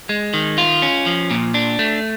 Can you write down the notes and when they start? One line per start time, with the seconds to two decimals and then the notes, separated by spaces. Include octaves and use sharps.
0.09 G#3
0.34 D#3
0.58 F4
0.82 C#4
1.06 F3
1.31 A#2
1.54 D4
1.79 A3